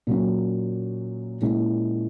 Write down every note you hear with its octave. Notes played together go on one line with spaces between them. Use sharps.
A#2 F#3 C#4
A#2 G#3 C#4 E4